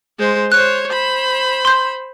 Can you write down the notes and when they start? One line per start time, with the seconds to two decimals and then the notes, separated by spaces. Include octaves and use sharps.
0.19 G#3 C5
0.52 C5 C#5 F#6
0.88 C5 B5
1.65 C6 G6